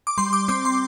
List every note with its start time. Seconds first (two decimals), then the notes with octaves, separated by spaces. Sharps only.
0.07 D6
0.18 G3 C6
0.33 D6
0.48 C4 D6
0.65 C6